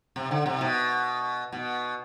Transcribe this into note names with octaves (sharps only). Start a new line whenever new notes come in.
C3
D3
C3
B2
B2